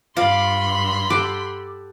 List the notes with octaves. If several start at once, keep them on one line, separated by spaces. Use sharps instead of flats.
G2 F4 F5 B5 C6 D6
G4 A4 F#5 D6